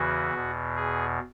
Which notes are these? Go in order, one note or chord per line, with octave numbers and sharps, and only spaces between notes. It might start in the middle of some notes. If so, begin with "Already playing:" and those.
Already playing: E2 C#3 E3 F#4
E2 B2
G#4